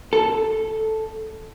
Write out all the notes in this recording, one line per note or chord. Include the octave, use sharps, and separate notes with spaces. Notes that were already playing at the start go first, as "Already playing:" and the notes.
A4